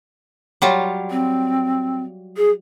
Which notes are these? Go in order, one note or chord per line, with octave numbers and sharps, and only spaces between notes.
F#3 G3 F4
C4
G#4